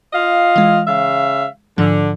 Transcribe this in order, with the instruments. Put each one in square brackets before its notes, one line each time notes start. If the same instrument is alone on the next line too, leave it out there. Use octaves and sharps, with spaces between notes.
[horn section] F4 D#5 F5
[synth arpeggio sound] E3 G#3
[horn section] C#3 E5 F5
[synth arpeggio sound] G#2 F3 [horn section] D3